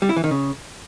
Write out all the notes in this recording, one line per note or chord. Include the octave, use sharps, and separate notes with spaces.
G3
E4
E3
D#3
C#3